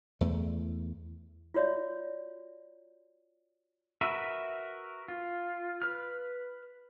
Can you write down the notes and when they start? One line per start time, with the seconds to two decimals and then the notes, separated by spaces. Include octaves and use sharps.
0.21 E2 A3
1.54 F4 F#4 C#5 D5 E5
4.01 F#4 A#4 B4 E5
5.08 F4
5.82 B4 F6